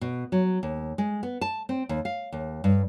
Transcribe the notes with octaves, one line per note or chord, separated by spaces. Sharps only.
B2
F#3
D#2
G#3
B3
A5
C4
D#2
F5
D#2
G2